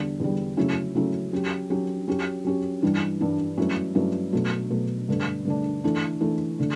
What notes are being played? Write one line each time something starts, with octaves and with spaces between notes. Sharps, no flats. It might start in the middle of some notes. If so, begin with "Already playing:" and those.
Already playing: E2 D3 G3
E2 D3 G3
C#3 F#3 A3 C#4 E4
C#3 F#3 A3 C#4 E4
F#3 C#4 G4
F#3 C#4 G4
F#3 C#4 G4
F#3 C#4 G4
G2 E3 G3 D4
G2 E3 G3 D4
G2 F#3 A3 C#4 E4
G2 F#3 A3 C#4 E4
B2 F#3 A3
B2 F#3 A3
G2 D3 A3 D4
G2 D3 A3 D4
E3 A3 D4
E3 A3 D4
D3 A3